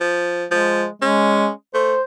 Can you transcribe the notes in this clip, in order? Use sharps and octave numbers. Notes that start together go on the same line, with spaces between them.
F3
F3 G#3
G#3 C#4
A3 C5